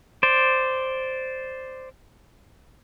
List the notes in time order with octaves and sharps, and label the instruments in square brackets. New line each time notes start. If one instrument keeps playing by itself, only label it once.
[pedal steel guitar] C5 D5